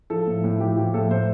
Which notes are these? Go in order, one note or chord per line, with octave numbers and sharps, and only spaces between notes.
F3 A4
A2
A2
F3 G4
F3 G4
A2 A4
A2 C5